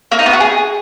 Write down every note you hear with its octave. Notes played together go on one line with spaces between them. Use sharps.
A#3
D#4
B3
F#4
G#4